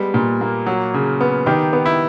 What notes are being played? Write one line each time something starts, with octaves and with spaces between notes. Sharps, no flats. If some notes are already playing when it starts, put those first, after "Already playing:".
Already playing: G3 G#3 B3
A#2
A#3
F#3
C#3
B3
D#3 G4
B3
E4